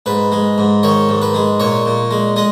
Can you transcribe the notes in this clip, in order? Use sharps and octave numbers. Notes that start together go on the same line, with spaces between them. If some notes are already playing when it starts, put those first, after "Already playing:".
G#2 B4
G#3
G#2
D#3 C#5
G#2
B4
G#3
A#2 C#5
A#2
G#3
G#3 D#5